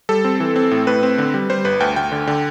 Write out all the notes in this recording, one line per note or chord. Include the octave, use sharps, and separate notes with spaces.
G3 A4
C4
E3
C4
A2
A2 B4
C4
D3
G3
G3 C5
G1 B4
D2 G5
D2 G5
D3
D3